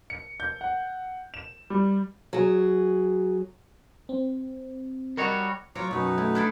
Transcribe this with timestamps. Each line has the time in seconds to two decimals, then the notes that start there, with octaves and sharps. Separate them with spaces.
0.10 C#7
0.40 G6
0.61 F#5
1.34 E7
1.70 G3
2.33 F#3 G#4
4.09 C4
5.17 G3 F#4 A#4 C#5 D#5
5.75 F#3 F4 C#5 A#5 D6
5.91 F#2 B2 F#3 D#4 B4 F#5
6.18 A3 E4
6.35 D4 E4 A4